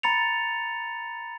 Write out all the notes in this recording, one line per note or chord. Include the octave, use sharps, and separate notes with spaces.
A#5 B5 A6 C#7 F7